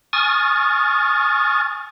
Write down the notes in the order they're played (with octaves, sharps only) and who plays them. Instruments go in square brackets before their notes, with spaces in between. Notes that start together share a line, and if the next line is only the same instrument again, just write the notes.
[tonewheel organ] G#5 C#6 D#6 F6 A6